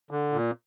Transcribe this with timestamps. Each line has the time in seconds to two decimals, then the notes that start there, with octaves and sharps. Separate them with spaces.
0.11 D3
0.33 A#2